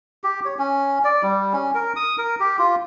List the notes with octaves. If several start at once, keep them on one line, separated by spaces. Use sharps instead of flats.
G4
C#5
C#4
D5
G3
C#4
A#4
D#6
A#4
G4
F4